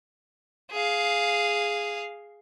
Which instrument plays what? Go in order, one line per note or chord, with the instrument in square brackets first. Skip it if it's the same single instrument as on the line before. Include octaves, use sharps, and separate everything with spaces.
[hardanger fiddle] G#4 F5